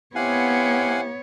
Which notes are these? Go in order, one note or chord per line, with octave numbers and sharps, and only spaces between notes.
B3 C4 E4 G4 C#5 F5 F#5 G#5